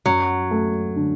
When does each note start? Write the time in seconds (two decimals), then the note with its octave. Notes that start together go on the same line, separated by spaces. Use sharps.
0.06 F#2 F#3
0.51 A3
0.96 D3